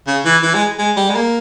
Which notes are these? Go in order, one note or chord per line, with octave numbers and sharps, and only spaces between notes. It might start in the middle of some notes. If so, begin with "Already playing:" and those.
C#3
E3
E3
G#3
G#3
G3
G#3
A#3